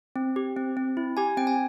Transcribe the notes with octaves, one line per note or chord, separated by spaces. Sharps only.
C4
G4
C4
C4
E4
G4 G#5
C4 G5
G#5